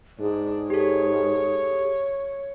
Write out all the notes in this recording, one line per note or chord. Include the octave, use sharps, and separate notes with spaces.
G#2 D4 G#4
G4 A4 C#5